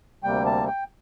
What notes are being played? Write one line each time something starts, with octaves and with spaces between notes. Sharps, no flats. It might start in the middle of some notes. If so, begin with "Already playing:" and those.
D2 C3 G3 A#3 G5
A5
G5